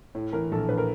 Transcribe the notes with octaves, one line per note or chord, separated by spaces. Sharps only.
A2
E3 A#4
A#1 A4
A#1 B4
A#4